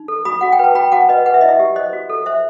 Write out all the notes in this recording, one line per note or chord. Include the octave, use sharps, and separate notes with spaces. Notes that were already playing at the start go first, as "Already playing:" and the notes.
Already playing: D#4
A4
F#4 B5 D#6
F#4 F#5
G5
B4 A5
F#4 G5 B5
F#4 F#5 A5
B4 D#5
B4 F#5
E5
E4 D#5
E5
G4
C5 D#5
F#4
A4
C5 E5